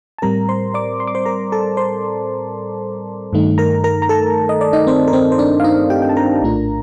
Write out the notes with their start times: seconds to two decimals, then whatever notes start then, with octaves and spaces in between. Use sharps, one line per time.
0.18 A5
0.22 A2 G3 C4 A#4 A#5
0.49 C5 C6
0.74 D5 D6
1.00 C6
1.07 D6
1.15 C5 C6
1.25 A#4 A#5
1.52 A4 A5
1.77 C5 C6
3.33 G2 D#3 A3 D#4
3.58 A#4 A#5
3.84 A#4 A#5
4.02 A#5
4.09 A4 A5
4.49 D#5
4.61 D5
4.73 D#4 D#5
4.87 C4 C5
5.08 A#4
5.13 C4 C5
5.32 C5
5.38 D4 D5
5.60 F5
5.64 D#4 D#5
5.90 G4 G5
6.02 G5
6.09 A5
6.16 A#4 A#5
6.42 A#1 A2 A3 D4 F4